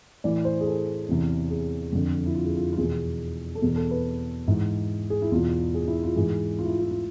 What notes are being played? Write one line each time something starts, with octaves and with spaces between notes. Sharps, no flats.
A2 E3 D5
C5
G#4
A4
E2 C3 E3
G#4
F2 D3
E4
F4
G#4
F4
F4
E2 B2 G#4
A4
E2 B2 G#4
A4
B4
G#2 E3
G#4
E4
E2 B2 F4
G#4
E4
F4
G#2 E3 G#4
F4
E4
F4
E4
F4